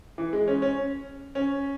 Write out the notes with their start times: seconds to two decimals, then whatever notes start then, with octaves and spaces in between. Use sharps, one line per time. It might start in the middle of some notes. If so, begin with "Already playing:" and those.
0.18 E3
0.33 G#3
0.48 C#4
0.62 C#4
1.35 C#4